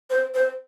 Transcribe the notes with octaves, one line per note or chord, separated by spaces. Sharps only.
C5
C5